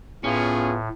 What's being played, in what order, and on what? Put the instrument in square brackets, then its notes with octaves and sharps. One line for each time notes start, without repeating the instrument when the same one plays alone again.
[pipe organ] A2 [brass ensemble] B3 F4 [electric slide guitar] C#4 [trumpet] G#4